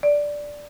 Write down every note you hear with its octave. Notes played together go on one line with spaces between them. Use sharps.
D5